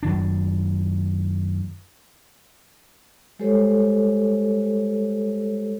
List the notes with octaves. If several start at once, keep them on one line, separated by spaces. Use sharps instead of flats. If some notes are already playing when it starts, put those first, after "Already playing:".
F#2 D#3 D4
G3 G#3 G4 A4 C5 C#5